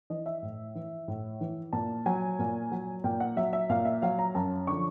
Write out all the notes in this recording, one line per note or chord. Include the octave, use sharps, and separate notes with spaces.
E3 D#5
E5
A2
E3
A2
E3
A#2 A5
F#3 G#5
A#2
F#3
A#2 G5
F#5
F#3 E5
E5
A#2 F5
E5
F#3 F5
A#5
F#2 A5
D3 F3 C#6